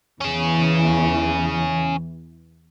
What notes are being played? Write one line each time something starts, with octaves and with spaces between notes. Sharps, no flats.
E2 E3 C#4 G#4